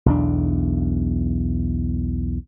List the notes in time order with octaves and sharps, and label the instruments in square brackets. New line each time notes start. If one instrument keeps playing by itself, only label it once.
[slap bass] B1 E2 D4